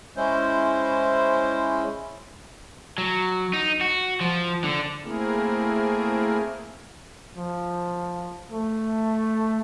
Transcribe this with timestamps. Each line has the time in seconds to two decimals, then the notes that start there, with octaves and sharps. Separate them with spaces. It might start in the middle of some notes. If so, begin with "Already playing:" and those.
0.17 G#3 C#4 E4 C5
2.98 F#3
3.53 D#4
3.81 F#4
4.21 F3
4.64 D3
5.03 A3 A#3 C4 E4 G#4 A#4
7.34 F3
8.51 A3